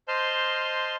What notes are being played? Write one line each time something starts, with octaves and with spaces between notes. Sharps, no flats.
C5 D#5 A5 C6 F6 G6